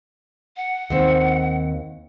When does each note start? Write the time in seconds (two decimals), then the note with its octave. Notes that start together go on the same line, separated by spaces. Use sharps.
0.57 F#5
0.90 D#2 C4